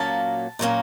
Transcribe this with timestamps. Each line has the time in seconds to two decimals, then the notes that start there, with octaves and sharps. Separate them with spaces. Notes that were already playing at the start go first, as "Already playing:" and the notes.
Already playing: A#2 F#3 A#3 C#4 A5
0.59 A#2 F#3 A#3 C#4